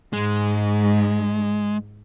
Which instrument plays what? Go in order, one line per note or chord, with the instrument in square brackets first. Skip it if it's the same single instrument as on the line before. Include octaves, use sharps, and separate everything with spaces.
[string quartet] G#2 [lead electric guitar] G#3